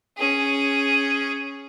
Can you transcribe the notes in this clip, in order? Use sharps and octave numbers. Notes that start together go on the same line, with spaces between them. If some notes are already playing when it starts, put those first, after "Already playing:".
C#4 G#4